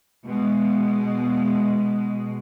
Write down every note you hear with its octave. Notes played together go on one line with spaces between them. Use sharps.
B2 G#3